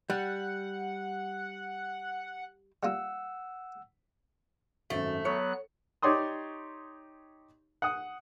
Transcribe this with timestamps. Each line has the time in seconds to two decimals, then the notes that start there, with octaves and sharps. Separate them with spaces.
0.10 G3 F#5
2.83 G3 A#3 F4 F#5 E6
4.90 G#1 F#2 A3
5.25 F#3 B3 C#5 F#6 C#7
6.02 D#4 G4 C#5 D5 C6 D#6
7.82 F#5 D#6